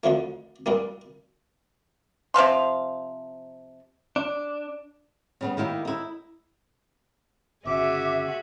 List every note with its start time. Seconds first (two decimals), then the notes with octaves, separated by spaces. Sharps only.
0.04 D2 D3 F3 A3
0.66 G2 G3 A#3
2.34 C3 F3 F5 C6
4.16 D4
5.41 C#3 G3 B3
5.57 D#3 A#3 E4 G4
5.85 D#4 E4
7.65 G1 C#3 F#4 G#4 E5 D6